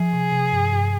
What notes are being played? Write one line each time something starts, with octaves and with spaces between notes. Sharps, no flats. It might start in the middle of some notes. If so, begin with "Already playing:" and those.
Already playing: F3 G#4
C3
C3
G2
G2